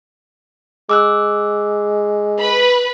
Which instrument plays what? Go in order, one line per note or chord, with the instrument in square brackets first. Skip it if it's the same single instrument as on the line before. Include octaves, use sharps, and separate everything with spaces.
[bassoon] G#3 [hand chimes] D6 E6 F#6
[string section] B4 B5